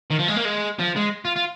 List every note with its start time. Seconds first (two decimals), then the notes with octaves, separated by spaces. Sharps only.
0.11 D#3
0.19 F3
0.28 G#3
0.36 A#3
0.45 G#3
0.79 F3
0.96 G#3
1.25 F4
1.36 F4